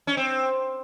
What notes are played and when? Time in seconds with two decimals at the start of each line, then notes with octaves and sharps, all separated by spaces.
0.07 C#4
0.17 C4